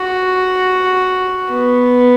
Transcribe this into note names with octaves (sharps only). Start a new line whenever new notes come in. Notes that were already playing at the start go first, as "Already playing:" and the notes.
Already playing: F#4
B3